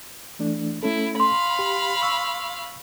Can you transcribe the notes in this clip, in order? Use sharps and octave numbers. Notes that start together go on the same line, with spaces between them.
E3 A3 D4
A3 C#4 E4 A4
F5 B5 C6
G4
C#6 E6